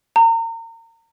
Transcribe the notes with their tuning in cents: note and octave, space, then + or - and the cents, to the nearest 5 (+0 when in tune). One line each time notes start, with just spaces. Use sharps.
A#5 -35